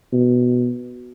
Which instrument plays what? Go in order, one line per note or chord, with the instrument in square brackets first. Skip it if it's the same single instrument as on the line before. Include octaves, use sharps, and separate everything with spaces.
[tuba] B2